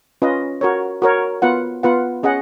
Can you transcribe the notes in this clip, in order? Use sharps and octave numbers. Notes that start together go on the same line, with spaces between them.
C#4 F4 B4 D#5
F#4 A#4 C#5
F#4 A#4 C#5
B3 F4 B4 F#5
B3 F4 B4 F#5
C#4 G#4 D#5 F#5